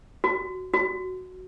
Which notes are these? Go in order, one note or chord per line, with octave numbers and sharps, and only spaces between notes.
F#4
F#4